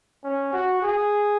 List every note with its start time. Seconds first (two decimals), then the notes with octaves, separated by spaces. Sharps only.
0.24 C#4
0.53 F#4
0.82 G#4